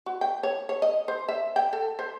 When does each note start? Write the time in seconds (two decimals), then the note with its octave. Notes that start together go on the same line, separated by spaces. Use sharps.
0.06 F#4
0.21 G5
0.43 C#5
0.69 C#5
0.82 D#5
1.08 C5
1.29 E5
1.56 G5
1.73 A4
1.99 C5